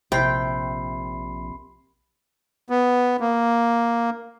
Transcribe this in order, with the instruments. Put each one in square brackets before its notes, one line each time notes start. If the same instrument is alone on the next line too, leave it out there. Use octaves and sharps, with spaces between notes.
[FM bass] A#1 [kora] C3 E4 [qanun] G5 [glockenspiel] B5 C6 C7
[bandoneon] B3
A#3